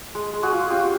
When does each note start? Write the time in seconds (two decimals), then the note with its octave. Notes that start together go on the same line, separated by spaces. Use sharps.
0.15 G#3
0.33 G#3
0.43 F#4 G#4
0.52 F4
0.70 C#4 F4 G4